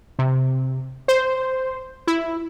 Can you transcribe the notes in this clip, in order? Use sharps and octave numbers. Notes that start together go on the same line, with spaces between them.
C3
C5
E4